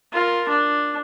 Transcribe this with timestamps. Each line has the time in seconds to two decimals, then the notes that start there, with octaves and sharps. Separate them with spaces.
0.13 F4 A#4
0.49 D4